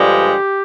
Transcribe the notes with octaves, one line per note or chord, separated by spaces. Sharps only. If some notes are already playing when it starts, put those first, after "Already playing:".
Already playing: G2 D3 F3 G#3 G4